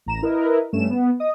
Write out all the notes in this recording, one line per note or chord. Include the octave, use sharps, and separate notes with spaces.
A1 A#5 E7
E4 A#4 B4 D#5 E5
G2 A3 C#4 E7
B3
D#5 D#6